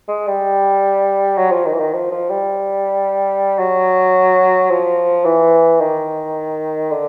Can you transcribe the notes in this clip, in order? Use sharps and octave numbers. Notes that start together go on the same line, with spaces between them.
G#3
G3
F#3
F3
D#3
E3
D#3
F3
F3
G3
F#3
F3
E3
D#3
D3